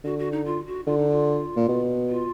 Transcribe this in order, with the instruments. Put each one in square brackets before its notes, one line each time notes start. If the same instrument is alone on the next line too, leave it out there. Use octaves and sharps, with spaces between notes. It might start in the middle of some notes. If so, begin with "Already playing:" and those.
[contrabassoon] D3 [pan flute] F#4
[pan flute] F#4
D#4
F4
F#4
[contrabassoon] D3 [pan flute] F4
[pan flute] D#4
F4
[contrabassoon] A#2
B2
[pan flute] F4